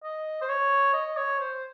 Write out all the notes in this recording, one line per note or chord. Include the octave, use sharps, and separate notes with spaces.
D#5
C5
C#5
D#5
C#5
C5